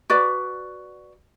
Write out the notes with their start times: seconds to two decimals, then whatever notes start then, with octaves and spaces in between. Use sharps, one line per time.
0.10 F#4 B4 D5